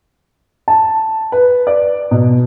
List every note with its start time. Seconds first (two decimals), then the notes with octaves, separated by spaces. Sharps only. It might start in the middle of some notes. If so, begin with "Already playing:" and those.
0.68 A5
1.32 B4
1.67 D5
2.11 B2